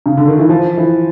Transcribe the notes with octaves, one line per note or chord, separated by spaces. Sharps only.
C#3
D3
D#3
E3
F3
E3